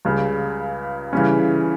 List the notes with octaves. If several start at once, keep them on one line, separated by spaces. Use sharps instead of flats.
C#2 C#3 G3
C#3 E3 G3 C#4